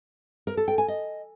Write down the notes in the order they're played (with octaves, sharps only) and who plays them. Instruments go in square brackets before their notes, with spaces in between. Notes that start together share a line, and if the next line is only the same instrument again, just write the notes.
[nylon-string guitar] A#4
A4
G5
G#5
D#5